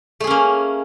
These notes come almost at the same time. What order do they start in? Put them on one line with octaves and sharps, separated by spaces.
A3 G#4 C#4 A#3